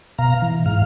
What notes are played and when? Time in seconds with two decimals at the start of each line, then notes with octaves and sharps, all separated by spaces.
0.18 B2 F5 A#5
0.42 E3
0.66 G#2 F5